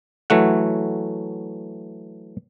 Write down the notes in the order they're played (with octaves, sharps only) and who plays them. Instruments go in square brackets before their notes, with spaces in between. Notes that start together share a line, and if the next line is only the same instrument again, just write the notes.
[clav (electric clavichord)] E3 F#3 A3 F#5